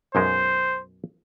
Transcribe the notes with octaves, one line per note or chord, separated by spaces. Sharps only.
B1 F#2 G#3 C5